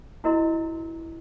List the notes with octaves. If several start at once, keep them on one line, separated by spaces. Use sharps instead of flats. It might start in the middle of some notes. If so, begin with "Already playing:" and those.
E4 F#4 A#4 D#5 A#5 C6